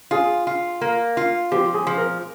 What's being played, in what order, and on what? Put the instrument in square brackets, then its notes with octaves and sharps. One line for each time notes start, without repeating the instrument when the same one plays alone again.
[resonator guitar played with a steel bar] F4 [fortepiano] G#4
[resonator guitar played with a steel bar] F4
A#3
F4
[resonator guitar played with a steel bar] F3 [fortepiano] G4
[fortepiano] G#4
[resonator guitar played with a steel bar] F3
[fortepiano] A#4